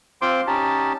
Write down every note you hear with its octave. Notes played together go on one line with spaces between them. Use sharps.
C4 F4 C5 C6 D6
C#4 D#4 G4 A5